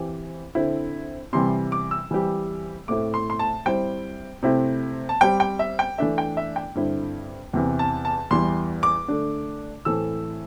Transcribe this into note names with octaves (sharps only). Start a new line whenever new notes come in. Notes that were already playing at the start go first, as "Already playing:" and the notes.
Already playing: E3 C4 G4
D3 C4 E4
C3 E3 G3 C6
D6
E6
E3 G3 C4 G4
A2 A3 C4 E4 D6
C6
C6
A5
G3 C4 E4 C5 G5
C3 A3 C4 E4
A5
G3 C4 G4 C5 G5
G5
E5
G5
E3 A3 D4 A4 E5
G5
E5
G5
G2 D3 C4 E4
E2 C3 E3
A5
A5
E2 E3 G3 C6
D6
D3 A3 D4
A2 E3 C4 A4 E6